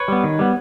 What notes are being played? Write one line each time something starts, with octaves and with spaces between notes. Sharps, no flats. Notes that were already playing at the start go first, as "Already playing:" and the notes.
Already playing: B4 C#5
G3 B3
D#3
G3 B3